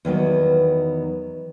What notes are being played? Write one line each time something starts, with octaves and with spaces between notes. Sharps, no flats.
E2 D#3 F#3 B3